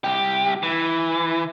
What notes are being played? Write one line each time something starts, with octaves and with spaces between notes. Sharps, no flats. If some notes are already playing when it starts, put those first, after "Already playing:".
C2 G4
E3